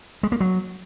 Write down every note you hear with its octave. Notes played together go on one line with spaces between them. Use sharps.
G#3
A#3
F#3